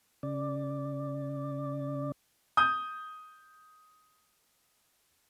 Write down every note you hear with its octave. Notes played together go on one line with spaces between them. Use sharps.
C#3 D5
D#6 G6